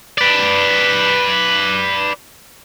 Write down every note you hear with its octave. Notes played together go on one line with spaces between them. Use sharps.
B4 D5